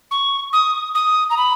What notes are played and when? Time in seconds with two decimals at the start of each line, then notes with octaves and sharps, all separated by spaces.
0.11 C#6
0.53 D#6
0.95 D#6
1.30 A#5
1.37 B5